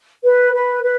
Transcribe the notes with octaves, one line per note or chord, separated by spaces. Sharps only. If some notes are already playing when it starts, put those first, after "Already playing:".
B4
B4
B4